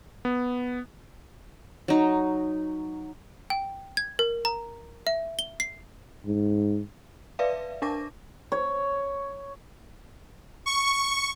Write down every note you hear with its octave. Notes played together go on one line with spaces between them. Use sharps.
B3
F#3 D#4
G5
G#6
A#4
A#5
E5
G7
C7
G#2
B4 D5 E5 F5
D4 A#4 A5 D6 A#6
C#5
C#6